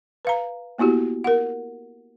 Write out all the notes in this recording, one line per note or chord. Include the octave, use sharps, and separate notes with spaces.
B4 F5 A#5
A#3 B3 E4 F#4 G4
A#4 F#5